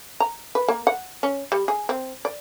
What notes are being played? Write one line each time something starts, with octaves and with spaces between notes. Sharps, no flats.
A#5
B4
A#3
F#5
C#4
G3
G#4
C4
D5